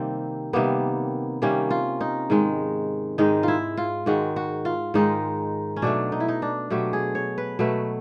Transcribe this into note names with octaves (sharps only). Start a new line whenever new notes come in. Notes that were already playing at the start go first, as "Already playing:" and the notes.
Already playing: C3 D#3 G3 A#3 C4
C3 D#3 G3 A#3 B3
C3 D#3 G3 A#3 C#4
F4
D#4
G#2 D#3 G#3
G#2 D#3 G#3 D#4
E4 F4
F4
G#2 D#3 G#3 F#4
F#4
F4
G#2 D#3 G#3 D#4
C#4
B2 F#3 A3 D4
D#4
E4
D#4
D4
B2 F#3 A3 G4
G#4
C#5
B4
B2 F#3 A3 B4